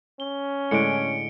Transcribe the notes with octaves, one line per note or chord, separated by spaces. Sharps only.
C#4 G7
A2 D3 G#3 C#7 D7